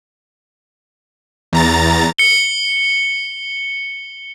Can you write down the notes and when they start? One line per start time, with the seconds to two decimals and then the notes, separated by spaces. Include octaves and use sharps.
1.53 E2 A#5 A6
2.19 C#7 G7